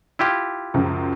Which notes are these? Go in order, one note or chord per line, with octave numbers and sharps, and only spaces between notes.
E4 F4 G4
C#2 F#2 F3